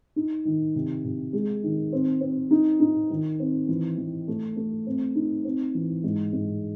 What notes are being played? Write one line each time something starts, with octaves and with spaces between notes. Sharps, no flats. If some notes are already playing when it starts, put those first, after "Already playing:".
D#4
D#3
C3
C3
G#3
D#3
C4
C4
D#4
D#4
D#3
C4
E3
E3
A3
A3
C4
D#4
C4
E3
G#2
G#2